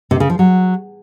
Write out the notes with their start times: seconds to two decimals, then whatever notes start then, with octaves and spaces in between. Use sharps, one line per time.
0.11 C3
0.20 C#3
0.30 F3
0.39 F#3